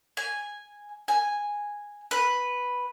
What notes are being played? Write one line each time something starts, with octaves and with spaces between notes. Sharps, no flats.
G#5
G#5
B4